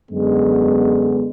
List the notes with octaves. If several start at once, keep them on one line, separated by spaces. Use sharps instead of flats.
F#2 D3 G#3 B3